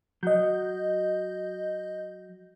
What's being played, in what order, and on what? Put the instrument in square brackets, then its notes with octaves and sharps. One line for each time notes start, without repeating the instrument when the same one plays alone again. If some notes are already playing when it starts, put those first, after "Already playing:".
[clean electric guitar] F#3 [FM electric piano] D#5 G6